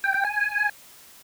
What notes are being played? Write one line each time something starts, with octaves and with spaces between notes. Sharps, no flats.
G5
G5
G#5